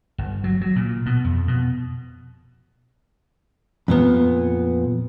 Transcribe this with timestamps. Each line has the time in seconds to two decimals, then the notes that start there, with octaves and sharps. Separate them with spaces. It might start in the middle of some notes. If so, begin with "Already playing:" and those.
0.18 G1
0.44 F#3
0.61 F#3
0.76 A#2
1.06 B2
1.25 F2
1.48 B2
3.88 F2 A#2 B3